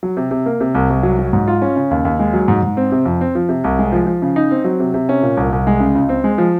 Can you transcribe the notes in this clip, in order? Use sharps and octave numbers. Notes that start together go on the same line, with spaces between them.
F#3
C3
C3
A#3
C3
C2
C2
F#3
F#3
G#2
F4
C#4
C#3
D#2
D#2
G#3
F#3
G#2
G#2
C4
C3
F2
C4
F3
C3
C2
G#3
F3
F3
C#3
D#4
C4
F#3
C3
C3
C#4
A#2
C2
C2
G#3
C#3
C#2
C4
G#3
F3